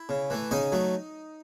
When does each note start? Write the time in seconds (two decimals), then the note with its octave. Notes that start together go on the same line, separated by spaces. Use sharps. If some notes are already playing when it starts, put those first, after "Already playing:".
Already playing: E4
0.09 C#3
0.30 E3 A3
0.51 C#3 D#4 D#5
0.72 F#3 A3